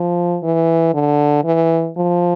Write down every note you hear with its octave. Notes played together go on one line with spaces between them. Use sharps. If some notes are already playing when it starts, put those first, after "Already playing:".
Already playing: F3
E3
D3
E3
F3